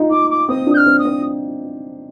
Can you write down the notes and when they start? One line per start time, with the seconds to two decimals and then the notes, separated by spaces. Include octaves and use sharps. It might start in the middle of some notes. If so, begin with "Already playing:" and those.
Already playing: D#4 F4
0.10 D#4 D6
0.29 D6
0.48 C4 D#6
0.67 D4
0.73 G6
0.77 F6
0.86 C4
0.98 D#6
1.05 C4